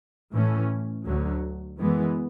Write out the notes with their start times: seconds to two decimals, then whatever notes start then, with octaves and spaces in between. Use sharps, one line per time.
0.33 A2 E3 A3 C#4
1.05 D2 D3 F#3
1.78 F#2 E3 G#3 B3